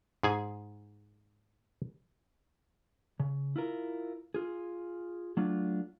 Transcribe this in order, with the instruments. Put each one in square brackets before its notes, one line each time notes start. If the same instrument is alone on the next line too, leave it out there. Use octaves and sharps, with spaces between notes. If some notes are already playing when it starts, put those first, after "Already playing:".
[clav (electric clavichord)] G#2 G#4 G#5
[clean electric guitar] C#3
E4 F4 A#4
F4 G#4
F#3 A3 D4 F4